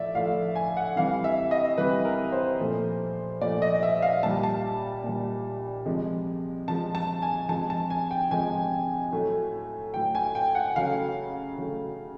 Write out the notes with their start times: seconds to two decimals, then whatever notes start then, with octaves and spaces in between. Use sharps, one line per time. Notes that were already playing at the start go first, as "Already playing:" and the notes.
Already playing: A2 F3 D5 E5
0.15 A2 F3 A3 F5
0.55 G#5
0.77 F#5
0.96 C3 E3 G3 F5
1.24 E5
1.51 D#5
1.78 C3 E3 G3 B4
2.05 A#4
2.32 C5
2.60 A#2 F3 A3
3.41 A#2 F3 A3 D5
3.62 D#5
3.83 E5
4.02 F5
4.23 A#2 G3 A5
4.43 A5
5.04 A#2 G3
5.86 C3 F3 G#3
6.68 C3 F3 G#3 A5
6.95 A5
7.22 G#5
7.49 C3 F3 G#3 A5
7.70 A5
7.90 G#5
8.11 G5
8.30 C3 F3 G#3 G#5
9.12 A2 F#3 A3
9.94 A2 F#3 A3 G5
10.15 G#5
10.35 G5
10.55 F#5
10.76 C#3 F#3 A3 F5
11.57 C#3 F#3 A3